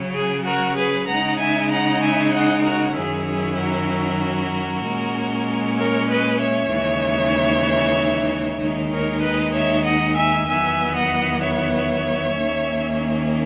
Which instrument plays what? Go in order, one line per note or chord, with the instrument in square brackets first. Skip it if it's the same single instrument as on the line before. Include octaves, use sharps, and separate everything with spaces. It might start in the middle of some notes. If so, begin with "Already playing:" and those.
Already playing: [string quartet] C#3 F#3 C#4
G#4
F#4 A#4
G#4 B4
C#3 G#3 D#4 F#5 A#5
E5 G#5
F#5 A#5
E5 G#5
D#5 F#5
F#4 A#4
F#2 D#3 F#3 C#4 E4 G#4
G#4
F#4 A#4
A#2 G#3 C#4
A#4 C#5
B4 D#5
C#5 E5
D#2 C#3 E3 G#3 D#4
D#2 D#3 G#3 D#4
A#4 C#5
B4 D#5
C#5 E5
D#5 F#5
E5 G#5
E2 D#3 F#3 B3 E5 G#5
D#5 F#5
C#5 E5
D#2 D#3 A#3 C#4